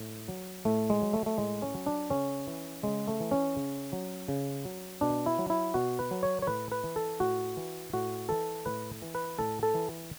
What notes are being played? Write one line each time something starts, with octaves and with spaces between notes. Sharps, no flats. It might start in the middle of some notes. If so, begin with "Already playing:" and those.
Already playing: A2
F#3
A2 A3
G#3
F#3
A3
A3
A2 G#3
C#4
F#3
D4
C#3 C#4
E3
C#3 G#3
A3
E3
C#4
C#3
F#3
C#3
F#3
B2 D4
E4
F#3
E4
B2 F#4
B4
F#3
C#5
C#5
A2 B4
B4
E3
A4
A2 F#4
E3
A2 F#4
E3 A4
A2 B4
E3
B4
A2 A4
A4
E3